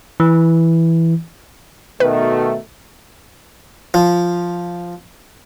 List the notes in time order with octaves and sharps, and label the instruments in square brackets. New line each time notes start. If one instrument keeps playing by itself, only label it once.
[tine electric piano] E3
[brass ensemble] B2 D#3 A3 [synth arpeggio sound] B4
[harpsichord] F3